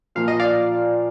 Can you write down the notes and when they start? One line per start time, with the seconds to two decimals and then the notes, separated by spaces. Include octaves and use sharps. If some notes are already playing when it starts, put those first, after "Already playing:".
0.15 A#2 F3 A#3 F5
0.28 D#5
0.40 D5 F5